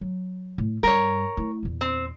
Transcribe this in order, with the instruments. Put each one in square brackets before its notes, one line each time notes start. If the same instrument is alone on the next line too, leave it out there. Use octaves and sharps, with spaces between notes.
[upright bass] F#3
A2
[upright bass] G2 G3 [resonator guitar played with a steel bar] A#4 C#5
[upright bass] A3 E4
E2 A#2
[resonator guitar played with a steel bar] C4